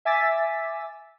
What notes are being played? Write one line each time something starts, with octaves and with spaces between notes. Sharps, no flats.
E5 G#5 D6 E6 A6 B6